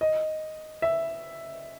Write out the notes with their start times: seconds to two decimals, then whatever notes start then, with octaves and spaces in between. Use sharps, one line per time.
0.01 D#5
0.82 E5